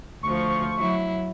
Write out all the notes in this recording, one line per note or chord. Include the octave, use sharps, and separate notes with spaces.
D2 F3 C#6
F#3 E4